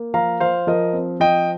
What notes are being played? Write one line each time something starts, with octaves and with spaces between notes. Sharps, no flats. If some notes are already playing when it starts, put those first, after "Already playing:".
Already playing: A#3
F3 F5 A#5
F3 C5 F5
F3 A#4 D#5
C4
F3 D#5 G5